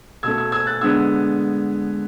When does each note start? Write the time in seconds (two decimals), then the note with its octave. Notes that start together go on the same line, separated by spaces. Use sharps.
0.23 B2 A3 E6 G#6
0.38 E6 G#6
0.52 E6 G#6
0.67 F#6 A6
0.81 D3 G#3 B3 E6 G#6